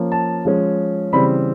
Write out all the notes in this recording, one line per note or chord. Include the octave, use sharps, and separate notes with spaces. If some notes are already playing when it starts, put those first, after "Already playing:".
Already playing: F3 A#3 C#4
A5
F3 G#3 C#4
C#3 E3 G3 C4 B5